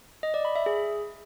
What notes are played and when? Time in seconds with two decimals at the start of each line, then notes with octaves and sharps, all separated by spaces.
0.23 D#5
0.34 D5
0.45 B5
0.55 E5
0.66 G#4